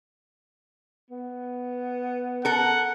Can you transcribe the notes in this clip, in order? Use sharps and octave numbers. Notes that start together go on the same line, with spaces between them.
B3
A4 A#4 F#5